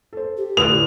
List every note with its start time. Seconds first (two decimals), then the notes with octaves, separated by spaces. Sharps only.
0.13 A4 C5
0.37 G4
0.57 A2 D3 E4 F4 B4 D#6 F7